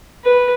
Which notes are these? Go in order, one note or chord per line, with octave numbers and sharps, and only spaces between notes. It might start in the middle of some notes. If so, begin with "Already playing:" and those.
B4